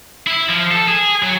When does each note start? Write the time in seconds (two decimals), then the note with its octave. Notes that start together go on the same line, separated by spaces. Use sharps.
0.27 E4
0.49 F3
0.71 A4
0.88 G#4
1.23 F#3